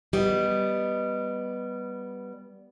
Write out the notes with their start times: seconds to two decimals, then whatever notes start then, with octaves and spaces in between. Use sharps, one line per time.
0.13 G3 B3 D#5